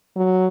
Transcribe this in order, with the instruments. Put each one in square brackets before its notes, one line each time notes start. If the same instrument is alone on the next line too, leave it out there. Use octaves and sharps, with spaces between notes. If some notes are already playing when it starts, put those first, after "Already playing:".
[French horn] F#3